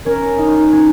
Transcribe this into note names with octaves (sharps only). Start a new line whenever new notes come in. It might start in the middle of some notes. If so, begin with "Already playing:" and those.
C#4 A#4
D#4
C#4